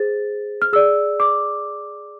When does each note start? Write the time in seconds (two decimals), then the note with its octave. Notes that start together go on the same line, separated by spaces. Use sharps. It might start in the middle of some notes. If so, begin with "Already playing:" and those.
Already playing: G#4 C5 A6
0.62 F6
0.72 G#4 D5 E6
1.20 D6